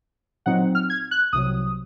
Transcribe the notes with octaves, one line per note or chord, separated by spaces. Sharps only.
A#2 F#3 C4 D#4 F#5
F6
G#6
F#6
C2 C3 F#3 D#6